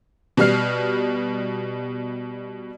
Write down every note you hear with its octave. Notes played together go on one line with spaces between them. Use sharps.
B2 G3 F6 C7